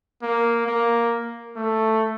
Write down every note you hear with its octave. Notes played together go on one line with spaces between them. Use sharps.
A#3
A#3
A3